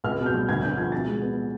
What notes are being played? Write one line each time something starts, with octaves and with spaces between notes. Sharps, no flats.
C#2 F6
B2
G6
G3
D2 G#6
D3 G6
F3 G#6
B2 A6
G#3
B3